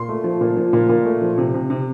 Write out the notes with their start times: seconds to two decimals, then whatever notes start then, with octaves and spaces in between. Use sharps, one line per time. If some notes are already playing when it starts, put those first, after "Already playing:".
Already playing: A#2 C6
0.09 A3
0.24 F3
0.41 A#2
0.56 F3
0.73 A#2
0.89 A#2
1.05 A3
1.22 F3
1.38 C3
1.54 C3
1.70 C3